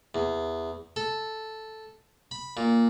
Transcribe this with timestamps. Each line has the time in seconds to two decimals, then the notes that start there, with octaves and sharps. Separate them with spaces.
0.15 E2
0.96 A4
2.31 B5
2.57 A#2